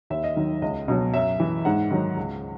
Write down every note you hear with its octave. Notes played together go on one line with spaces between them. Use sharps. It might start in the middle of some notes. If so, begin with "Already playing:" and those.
D#2 E5
D#5
D#3 F#3
C#2 D#5
B2 F#3
F#2 E5
E3
G#2 F#5
D#3 F#3
C#2